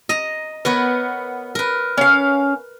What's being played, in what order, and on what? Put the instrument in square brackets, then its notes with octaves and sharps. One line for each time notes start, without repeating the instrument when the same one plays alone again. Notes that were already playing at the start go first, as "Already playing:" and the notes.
[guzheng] D#5 A#5
[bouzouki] B3 [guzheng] A#4 B4 C#5
[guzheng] A#4 B4
[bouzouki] C#4 F5